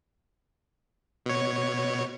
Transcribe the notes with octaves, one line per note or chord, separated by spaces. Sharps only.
B2 C#5